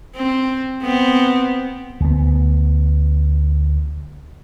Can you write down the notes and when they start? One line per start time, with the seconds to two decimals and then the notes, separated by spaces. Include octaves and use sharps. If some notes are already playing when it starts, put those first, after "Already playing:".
0.15 C4
0.82 B3 C4
2.00 D2 B3